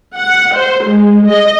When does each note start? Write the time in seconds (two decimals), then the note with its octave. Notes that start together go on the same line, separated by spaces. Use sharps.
0.16 F#5
0.55 C5
0.86 G#3
1.27 D#5